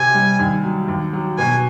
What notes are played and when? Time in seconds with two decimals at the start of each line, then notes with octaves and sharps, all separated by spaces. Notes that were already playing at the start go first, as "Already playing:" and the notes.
Already playing: C3 G#5
0.14 G3
0.39 D#2
0.63 F#3
0.88 D#2
1.13 F#3
1.38 B2 G#5